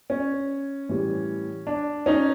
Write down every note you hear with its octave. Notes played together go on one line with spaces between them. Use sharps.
C#4
A2 E3 G3
D4
C#4 D#4